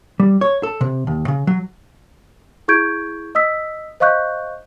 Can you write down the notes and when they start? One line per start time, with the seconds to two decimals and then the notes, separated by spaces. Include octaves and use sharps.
0.20 G3
0.41 C#5
0.63 A4
0.81 C3
1.07 D#2
1.28 C#3
1.47 F#3
2.68 E4 G#4 C#6 G6 G#6 D7
3.35 D#5 D#6 E6 B6
4.00 C5 D#5 F5 C#6 F#6 G6